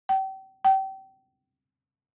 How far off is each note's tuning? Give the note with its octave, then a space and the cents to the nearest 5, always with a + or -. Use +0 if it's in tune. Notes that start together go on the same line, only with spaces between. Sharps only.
G5 -35
G5 -30